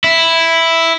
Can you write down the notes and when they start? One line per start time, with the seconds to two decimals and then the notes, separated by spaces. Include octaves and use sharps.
0.04 E4